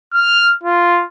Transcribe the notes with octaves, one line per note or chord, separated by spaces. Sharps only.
F6
F4